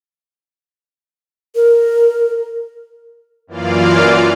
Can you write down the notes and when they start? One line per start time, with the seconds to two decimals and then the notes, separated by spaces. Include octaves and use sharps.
1.56 A#4
3.47 F#2 E3 A#3 F4 D5 F5